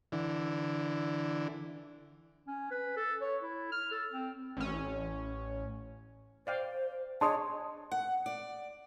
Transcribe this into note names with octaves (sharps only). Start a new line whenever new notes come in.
D3 E3
C#4
B4
A4
C#5
E4
F6
A4
C4
A1 C#4
C5 D5 F5 G5
D4 G#4 C#5 D#5 A5 C6 D#6
F#5
D5